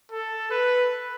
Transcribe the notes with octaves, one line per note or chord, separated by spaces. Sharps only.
A4
B4